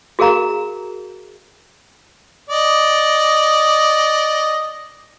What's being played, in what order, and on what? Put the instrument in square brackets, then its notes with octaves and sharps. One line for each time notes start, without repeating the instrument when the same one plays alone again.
[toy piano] F#4 G#4 A#4 F5 A#5
[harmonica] D5 D#5